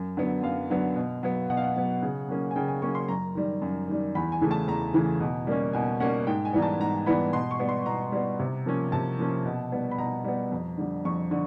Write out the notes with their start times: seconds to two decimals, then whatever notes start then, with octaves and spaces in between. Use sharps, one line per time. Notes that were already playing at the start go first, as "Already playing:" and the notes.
Already playing: F#2
0.17 D3 F#3 B3
0.43 F#2 F5
0.70 D3 F#3 B3
0.96 B2
1.23 F#3 B3
1.50 B2 F#5
1.57 F5
1.64 F#5
1.76 F#3 B3
2.02 C#3
2.28 F#3 A#3 C#4
2.51 G#5
2.56 C#3 G5
2.68 G#5
2.82 F#3 A#3 C#4 C#6
2.95 C6
3.08 F#2 A#5
3.35 D#3 G3
3.62 F#2
3.88 D#3 G3
4.15 E2 B5
4.32 G#5
4.41 C#3 E3 A3
4.51 A5
4.68 E2 A#5
4.94 C#3 E3 A3
5.20 B2
5.47 G3 A#3 C#4
5.73 B2 G#5
6.00 G3 A#3 C#4 F#5
6.27 G#2 G5
6.45 G#5
6.53 E3 G3 B3 A#5
6.62 A5
6.80 G#2 A#5
7.06 E3 G3 B3 B5
7.33 B2 C6
7.51 C#6
7.60 G3 B3
7.69 C6
7.86 B2 A#5
8.12 G3 B3
8.40 C3
8.66 F3 A#3 C#4
8.92 C3 A5
9.19 F3 A#3 C#4
9.45 B2
9.72 G3 B3
9.91 B5
9.98 B2 A#5
10.24 G3 B3
10.52 F2
10.78 D3 G3
11.05 F2 C#6
11.31 D3